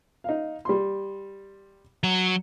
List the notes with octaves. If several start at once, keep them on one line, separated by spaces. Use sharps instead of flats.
D#4 F5
G3 C6
F#3